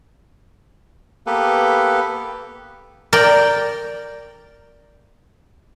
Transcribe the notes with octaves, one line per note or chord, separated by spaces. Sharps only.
A#3 B3 G4 A4 B4
A#4 D5 G5